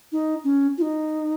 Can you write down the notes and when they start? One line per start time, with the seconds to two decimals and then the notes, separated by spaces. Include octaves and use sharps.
0.12 D#4
0.44 C#4
0.78 F4
0.82 D#4